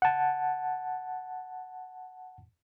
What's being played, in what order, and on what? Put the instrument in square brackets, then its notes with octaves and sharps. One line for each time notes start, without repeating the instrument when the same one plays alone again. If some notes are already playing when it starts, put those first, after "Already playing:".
[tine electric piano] F#5 A5